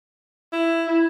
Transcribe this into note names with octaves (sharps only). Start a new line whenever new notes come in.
E4
E4